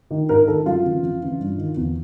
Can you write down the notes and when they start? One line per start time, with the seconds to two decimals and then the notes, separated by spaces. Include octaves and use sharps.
0.11 D#3
0.29 G#2 A#4
0.48 D#3 A4
0.66 F#2 F4
0.84 C#3 E3
1.03 F2
1.21 C#3 E3
1.40 G2
1.58 D#3
1.77 E2